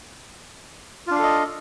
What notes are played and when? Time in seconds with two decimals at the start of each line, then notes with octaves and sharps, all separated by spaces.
1.07 F4
1.11 D4
1.15 F5
1.19 A4
1.23 D#5